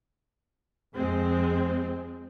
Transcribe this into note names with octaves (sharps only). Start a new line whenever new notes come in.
F2 G#3 C4